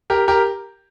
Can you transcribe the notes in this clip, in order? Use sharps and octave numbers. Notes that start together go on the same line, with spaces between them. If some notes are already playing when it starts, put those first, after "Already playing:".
G4 A#4
G4 A#4